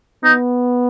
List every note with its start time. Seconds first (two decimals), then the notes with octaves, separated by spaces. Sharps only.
0.24 B3 D#4